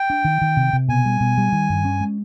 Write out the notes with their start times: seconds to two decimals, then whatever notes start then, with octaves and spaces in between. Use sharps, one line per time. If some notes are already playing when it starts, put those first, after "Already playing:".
Already playing: G5
0.10 D4
0.25 D#3
0.41 D#3
0.57 C3
0.73 C3
0.88 B2 G#5
1.05 G3
1.20 B2
1.38 G3
1.52 D#3
1.70 G2
1.85 C#4
2.01 G#3